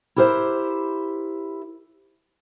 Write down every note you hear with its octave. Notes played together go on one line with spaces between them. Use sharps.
E4 G4 A#4 C5 E5